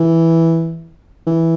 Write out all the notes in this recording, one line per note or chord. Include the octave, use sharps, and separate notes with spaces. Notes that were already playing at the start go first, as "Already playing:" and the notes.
Already playing: E3
E3